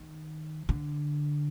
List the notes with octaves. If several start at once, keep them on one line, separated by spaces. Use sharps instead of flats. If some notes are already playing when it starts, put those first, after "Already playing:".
Already playing: D#3
D3